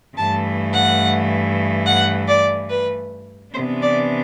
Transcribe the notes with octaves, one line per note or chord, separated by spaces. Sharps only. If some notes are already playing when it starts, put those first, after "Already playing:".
G2 E3 A3 A5
F#5
F#5
D5
B4
C3 E3 B3 D4 C5
D5